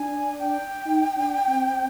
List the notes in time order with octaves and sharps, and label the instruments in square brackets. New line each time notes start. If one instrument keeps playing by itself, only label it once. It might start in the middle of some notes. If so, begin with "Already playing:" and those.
Already playing: [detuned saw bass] D4 [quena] G#5
[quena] G5
[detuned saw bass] D#4
D4
C4